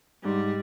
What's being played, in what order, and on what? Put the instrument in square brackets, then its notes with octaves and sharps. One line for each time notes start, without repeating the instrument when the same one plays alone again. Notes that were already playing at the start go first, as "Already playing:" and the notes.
[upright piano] G#2 [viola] G3